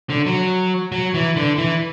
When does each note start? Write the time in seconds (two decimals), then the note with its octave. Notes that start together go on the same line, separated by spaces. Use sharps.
0.10 D3
0.26 F#3
0.92 F#3
1.14 E3
1.36 D3
1.58 E3